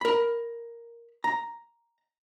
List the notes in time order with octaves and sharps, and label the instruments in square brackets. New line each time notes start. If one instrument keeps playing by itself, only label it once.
[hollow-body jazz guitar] A#4 B5
A#5